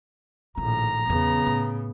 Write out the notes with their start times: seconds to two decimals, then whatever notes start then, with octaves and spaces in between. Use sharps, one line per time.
0.57 A#1 A2 D#3 A#5
1.07 E2 C#3 F#3 B3
1.46 A2